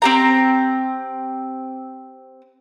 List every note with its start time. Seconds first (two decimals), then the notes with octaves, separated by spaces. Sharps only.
0.02 C4 G4 A#5